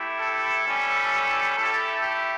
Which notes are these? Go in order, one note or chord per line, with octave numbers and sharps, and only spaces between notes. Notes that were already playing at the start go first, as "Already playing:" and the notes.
Already playing: A3 E4 G4
A4
G3 C#4 E4 G4
A3 E4 G4 A4
G4